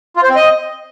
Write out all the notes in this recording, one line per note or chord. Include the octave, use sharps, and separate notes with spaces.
F4
C5
C4
D#5